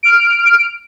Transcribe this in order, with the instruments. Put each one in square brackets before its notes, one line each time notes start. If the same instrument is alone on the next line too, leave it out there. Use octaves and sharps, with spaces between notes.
[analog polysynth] F6 D7